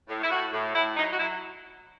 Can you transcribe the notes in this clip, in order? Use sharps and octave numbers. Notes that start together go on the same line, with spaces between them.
A2
E4
A2 F#4
A2
A2 E4
F#3 D#4
F#4
F#3 E4